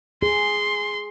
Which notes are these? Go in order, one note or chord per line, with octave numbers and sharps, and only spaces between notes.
G#4 C6